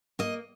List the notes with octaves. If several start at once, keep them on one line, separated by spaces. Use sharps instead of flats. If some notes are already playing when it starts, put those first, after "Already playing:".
A#3 D#5